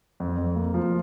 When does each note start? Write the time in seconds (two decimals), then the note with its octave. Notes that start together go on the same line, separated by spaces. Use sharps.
0.20 F2
0.38 F2
0.56 A#3
0.74 F3